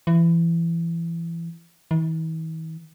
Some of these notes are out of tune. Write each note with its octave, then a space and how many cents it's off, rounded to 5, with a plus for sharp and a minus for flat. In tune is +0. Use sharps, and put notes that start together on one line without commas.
E3 +25
E3 -45